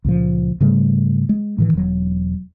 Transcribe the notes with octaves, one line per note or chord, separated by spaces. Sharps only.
C#2 A#2 F3
G#2 C#3 G3 A3
G#3
A2 D#3 E3
E1 F#3